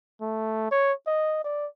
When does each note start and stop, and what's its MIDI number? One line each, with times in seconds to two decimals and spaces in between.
0.22 0.69 57
0.71 0.93 73
1.07 1.43 75
1.44 1.67 74